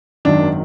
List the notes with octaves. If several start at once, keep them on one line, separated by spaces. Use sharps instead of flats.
G#1 F#2 D#3 F#3 D4